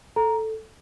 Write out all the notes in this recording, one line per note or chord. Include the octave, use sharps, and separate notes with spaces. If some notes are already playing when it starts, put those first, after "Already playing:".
A4 A#5